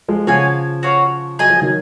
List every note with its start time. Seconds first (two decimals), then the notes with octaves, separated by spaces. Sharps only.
0.08 F3 G#3
0.27 C#3 F3 F#4 C#5 F5 G#5
0.83 F#4 C#5 F5
1.39 F#3 G#4 D#5 G#5
1.50 F3
1.62 D#3 F#3